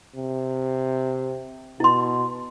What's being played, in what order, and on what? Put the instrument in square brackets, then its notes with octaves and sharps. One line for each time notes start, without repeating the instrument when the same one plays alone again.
[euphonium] C3
[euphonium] B2 [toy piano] E4 C6